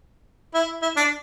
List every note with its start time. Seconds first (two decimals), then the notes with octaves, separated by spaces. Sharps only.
0.54 E4
0.82 E4
0.97 D4